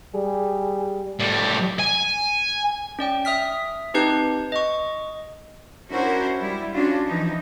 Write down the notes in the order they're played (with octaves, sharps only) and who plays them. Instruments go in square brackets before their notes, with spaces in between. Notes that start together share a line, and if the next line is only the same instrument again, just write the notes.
[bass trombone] G3 [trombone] G#4
[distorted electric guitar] A2 G3
G#5
[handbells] C#4 D5 G5
E5 D#6 F6 B6
C4 D#4 G4 B4 A5 G6
D#5 C#6
[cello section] C#4 D4 E4 F#4 A#4 C5
G3 E4
C#4 D4 F4 F#4
E3 F3 D#4